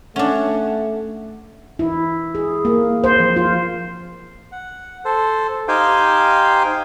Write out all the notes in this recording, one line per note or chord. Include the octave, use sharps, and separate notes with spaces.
A3 C#4 D4 F#5
E4
G#4
A#3
C5
F3
F4
F#5
A4 C5
D#4 G4 C5 F5 G5 G#5